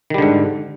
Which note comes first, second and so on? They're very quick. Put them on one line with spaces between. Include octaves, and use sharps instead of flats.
D#3 G3 D3 G#2